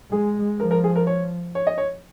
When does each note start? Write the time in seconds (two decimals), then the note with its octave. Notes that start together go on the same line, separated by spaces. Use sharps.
0.11 G#3 G#4
0.59 F3 A#4
0.71 A#4
0.84 G#4
0.96 A#4
1.07 C#5
1.55 C#5
1.67 D#5
1.78 C#5